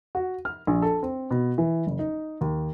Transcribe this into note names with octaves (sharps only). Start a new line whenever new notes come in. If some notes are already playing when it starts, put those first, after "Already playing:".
F#4
F6
A#1
A4
C4
B2
E3
F#1
D#4
D#2